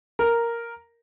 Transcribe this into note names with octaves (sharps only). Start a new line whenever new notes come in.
A#4